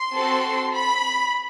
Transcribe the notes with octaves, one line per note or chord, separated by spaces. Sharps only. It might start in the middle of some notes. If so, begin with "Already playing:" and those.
Already playing: C6
C4 F#4 A4
B5